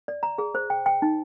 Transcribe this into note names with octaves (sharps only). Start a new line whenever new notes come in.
D5
A#5
G#4
C5
G5
G5
D#4